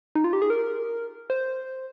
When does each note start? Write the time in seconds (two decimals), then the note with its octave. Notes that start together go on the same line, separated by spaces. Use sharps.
0.15 D#4
0.24 F4
0.33 G4
0.42 G#4
0.50 A#4
1.30 C5